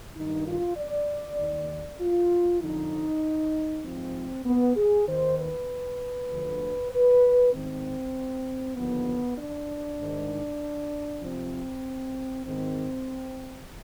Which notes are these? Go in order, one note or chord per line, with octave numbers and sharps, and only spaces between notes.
G2 D#3 D#4
F4
D5
D#2 D#3
F4
F2 D3 F3 D#4
G#2 F3 C4
B3
G#4
D#2 D#3 C5
B4
D2 D3 F3
B4
G#2 D#3 C4
D#2 D3 F3 B3
D4
G#2 D#3
F2 C3 F3 C4
G#2 D#3 C4